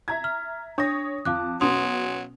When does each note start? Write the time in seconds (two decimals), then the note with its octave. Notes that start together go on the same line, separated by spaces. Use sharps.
0.08 E5 A#5 G#6
0.24 F6
0.78 D4 C#5 D#6 A#6
1.25 F2 F5 A5 D6 F#6
1.61 B2 F#3 C#4 C6 D#6 F7